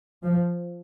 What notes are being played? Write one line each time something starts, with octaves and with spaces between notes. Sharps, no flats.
F3